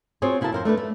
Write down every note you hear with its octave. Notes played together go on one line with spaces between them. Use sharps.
C4 F4 F#4 G#4 C5 C#5
C#3 E4 F#4 A#4 A5
F2 A#4 C5
A3 D4 A#4 B4
A3